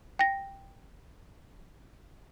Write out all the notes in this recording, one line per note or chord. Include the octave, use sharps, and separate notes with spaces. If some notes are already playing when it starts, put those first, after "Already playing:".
G5 A#6